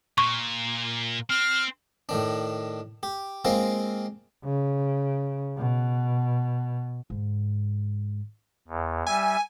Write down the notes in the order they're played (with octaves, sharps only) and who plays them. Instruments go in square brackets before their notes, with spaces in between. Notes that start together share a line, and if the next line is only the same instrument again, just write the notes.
[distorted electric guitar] A#2 [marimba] C#6
[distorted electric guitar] C4 [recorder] F6
[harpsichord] A2 D#3 D4
G4
G#3 A#3 C4 F4
[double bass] C#3
B2
[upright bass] G#2 D3
[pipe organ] E2
[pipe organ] G3 E5 [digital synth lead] G#5